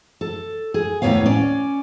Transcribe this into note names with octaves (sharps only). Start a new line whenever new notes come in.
A4
G#4
D#2 A2 D#3 B3 C#5 F5
C#4 D5